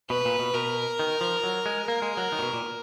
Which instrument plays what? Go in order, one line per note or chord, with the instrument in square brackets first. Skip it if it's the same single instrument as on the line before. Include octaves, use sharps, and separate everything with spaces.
[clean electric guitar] B2 [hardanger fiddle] B4
[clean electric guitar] A#2
B2
[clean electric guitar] B2 [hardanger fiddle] A#4
[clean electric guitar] D#3
F3
F#3
G#3
[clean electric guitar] A#3 [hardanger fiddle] A#4
[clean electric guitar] G#3
F#3
D#3
A#2
B2
A#2